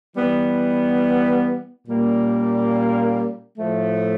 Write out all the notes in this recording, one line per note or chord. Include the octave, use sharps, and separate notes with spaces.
E3 G3 B3
A#2 G3 A#3 C#4
A2 F3 A3